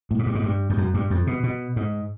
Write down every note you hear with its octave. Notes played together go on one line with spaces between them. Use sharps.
A2
G#2
G2
G#2
G2
F2
F#2
G2
F2
B2
B2
G#2